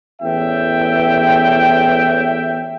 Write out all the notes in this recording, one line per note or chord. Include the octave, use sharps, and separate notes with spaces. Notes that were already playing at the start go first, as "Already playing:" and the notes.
A1 E2 E5 G5